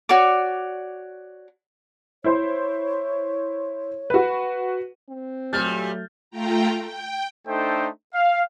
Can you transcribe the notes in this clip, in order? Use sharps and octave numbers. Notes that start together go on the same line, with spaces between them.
F#4 C#5 D5 D6
E4 C5 C#5 C6
F#4 B4
C4
A#2 F#3 G3 A3 F6 G6 A6
A3 F4 G5 A#5
G5
A3 D4 D#4 A4 C5 G5
F5